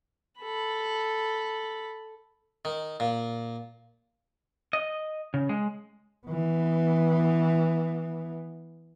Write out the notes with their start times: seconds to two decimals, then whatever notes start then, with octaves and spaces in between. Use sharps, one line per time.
0.40 A4 B5
2.65 D#3
3.00 A#2
4.73 D#5
5.34 C#3
5.49 G#3
6.27 E3 B3